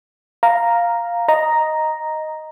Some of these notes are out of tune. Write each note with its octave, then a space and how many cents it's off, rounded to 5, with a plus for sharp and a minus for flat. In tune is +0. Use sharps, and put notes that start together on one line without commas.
F5 +0 A#5 +0
D#5 +0 A#5 +0